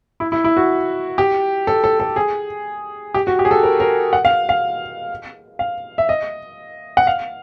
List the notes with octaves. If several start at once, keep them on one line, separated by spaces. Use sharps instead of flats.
E4
E4
E4
F#4
G4
A4
A4
A4
G#4
G4
F#4
G4
G#4
A4
A#4
A#4
F#5
F5
F5
F5
E5
D#5
F#5
F5